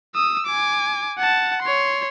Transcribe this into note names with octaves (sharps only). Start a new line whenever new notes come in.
D#6 E6
G#5 D6
F#5 A5
C#5 C6